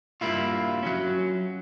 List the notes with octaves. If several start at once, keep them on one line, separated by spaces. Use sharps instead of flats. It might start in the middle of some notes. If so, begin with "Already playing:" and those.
G2 G3 A#3 E4 F4
F#3 C#4